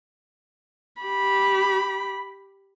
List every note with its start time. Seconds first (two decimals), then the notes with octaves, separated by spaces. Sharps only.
1.01 G4 B5